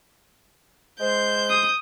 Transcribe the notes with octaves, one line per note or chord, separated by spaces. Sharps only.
G#3 C5 G6
D#6